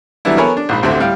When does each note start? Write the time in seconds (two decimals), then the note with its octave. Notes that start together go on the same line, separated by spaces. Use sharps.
0.25 E3 F#3 G3 B3 D4 E4
0.37 B3 A4 A#4 C#5 G#5 B5
0.57 D4
0.69 A#1 G#2 B5
0.82 A1 D2 D3 C4 E5
1.00 A2 G3 F5 G5